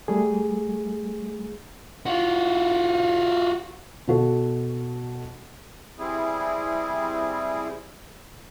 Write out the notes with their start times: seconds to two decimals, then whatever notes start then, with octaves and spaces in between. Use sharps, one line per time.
0.08 G3 A3 G#4
2.06 F4 F#4
4.08 B2 F#4 A4
5.99 G3 C4 E4 G#4